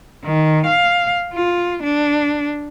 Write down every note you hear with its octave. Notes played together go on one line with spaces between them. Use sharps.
D#3
F5
F4
D4